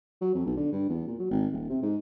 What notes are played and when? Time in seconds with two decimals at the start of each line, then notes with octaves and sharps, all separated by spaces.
0.21 F#3
0.35 F2
0.46 B1
0.57 D3
0.72 G2
0.90 E2
1.07 A#2
1.19 F#3
1.31 G#1
1.52 D#1
1.69 C3
1.82 G#2